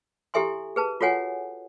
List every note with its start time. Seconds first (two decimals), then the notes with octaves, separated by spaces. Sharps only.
0.34 E4 G4 A4 E5 G#5 C6
0.76 G#4 B4 A5
1.01 F4 F#4 A4 C#5 F#5 G#5